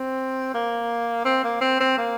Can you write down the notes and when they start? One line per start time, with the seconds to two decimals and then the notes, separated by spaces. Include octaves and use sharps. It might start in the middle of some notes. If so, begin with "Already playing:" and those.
Already playing: C4
0.54 A#3
1.25 C4
1.44 A#3
1.61 C4
1.80 C4
1.98 A#3